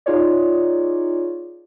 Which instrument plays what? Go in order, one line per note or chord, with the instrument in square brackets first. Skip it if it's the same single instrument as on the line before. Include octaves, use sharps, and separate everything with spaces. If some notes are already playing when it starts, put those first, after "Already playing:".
[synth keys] D#4 F4 G#4 C#5 D5